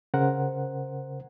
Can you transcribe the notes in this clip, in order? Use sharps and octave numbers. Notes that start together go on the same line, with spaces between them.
C#3 A#4 C5 F#5